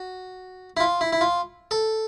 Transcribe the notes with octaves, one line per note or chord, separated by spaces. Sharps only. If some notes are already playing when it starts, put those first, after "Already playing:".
Already playing: F#4
E4
F4
E4
E4
F4
A4